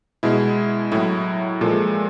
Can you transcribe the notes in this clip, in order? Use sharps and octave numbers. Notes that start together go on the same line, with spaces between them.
B2 G#3 E4
A2 F#3 E4
A#2 F3 G#3 A4